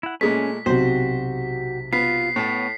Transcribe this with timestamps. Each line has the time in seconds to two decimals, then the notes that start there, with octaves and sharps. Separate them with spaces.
0.03 E4 F#5
0.21 A#2 G#3 A3 C#4 B6
0.66 B1 C3 F#4 G4 C5
1.93 B3 F4 B6 C7
2.36 A2 B3 C#5 A5